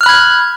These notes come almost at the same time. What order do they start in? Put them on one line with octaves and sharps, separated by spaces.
F6 F#6 B5 G#6